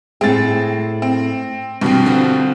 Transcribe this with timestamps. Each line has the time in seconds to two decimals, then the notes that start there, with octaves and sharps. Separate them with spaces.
0.21 A2 A3 C4 G#4 A6
1.02 C4
1.81 G2 B2 E3 C4
2.06 D3 F3 C4